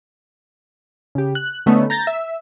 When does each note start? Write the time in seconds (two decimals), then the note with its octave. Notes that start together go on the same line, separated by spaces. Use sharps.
1.15 C#3 G4
1.35 F#6
1.66 D3 A3 B3 C#4 D#4
1.90 A#5 G6 A6 A#6
2.07 E5